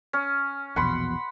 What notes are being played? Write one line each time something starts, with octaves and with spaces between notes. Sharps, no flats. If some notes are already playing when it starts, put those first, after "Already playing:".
C#4
A#1 E2 B2 F#5 B5 C6